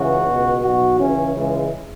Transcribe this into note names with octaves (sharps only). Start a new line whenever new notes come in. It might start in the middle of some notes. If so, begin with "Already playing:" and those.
Already playing: C#2 C#3 E3 F#4
C#2 B2
B1 B2 F#4
C#2 C#3 E3 C#4
C#2 C#3 E3 G#3